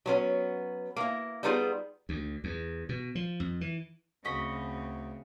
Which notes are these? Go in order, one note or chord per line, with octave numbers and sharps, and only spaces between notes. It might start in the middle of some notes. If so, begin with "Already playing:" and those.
F#3 B3 C#4
A#3 E4
G3 B3 D#4 F4 G#4
D2
E2
B2
F3
F2
E3
D2 C#3 C4 F#4 D#5 B5